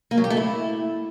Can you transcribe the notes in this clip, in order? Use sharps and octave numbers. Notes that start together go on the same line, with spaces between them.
A#3
F#3
G4
A3
E4